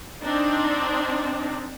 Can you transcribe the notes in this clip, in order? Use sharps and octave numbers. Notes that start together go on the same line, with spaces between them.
C4 D4 D#4